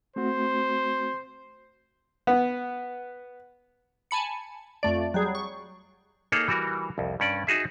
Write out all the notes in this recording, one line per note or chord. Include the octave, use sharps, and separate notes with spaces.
A3 C4 F#4 C5
B3
G#5 A5 B5 C#7
F2 A3 D5
F#3 G3 G#4
C#6
A#3 D#4 G#4 A4 C#5 A#5
E3 G3 F#4 A#4
C2 F2
G2 C#4 D5
D#4 F#4 G#4 E5